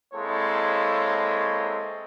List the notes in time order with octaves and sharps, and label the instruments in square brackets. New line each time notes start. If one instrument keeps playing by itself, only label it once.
[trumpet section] G#3 A#3 C4 E4 A4 C#5